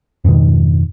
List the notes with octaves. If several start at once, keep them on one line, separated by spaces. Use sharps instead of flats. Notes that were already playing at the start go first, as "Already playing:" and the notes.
F2 G#2 B2 D#3